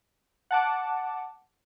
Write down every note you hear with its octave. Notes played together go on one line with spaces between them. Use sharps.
F#5 A5 D6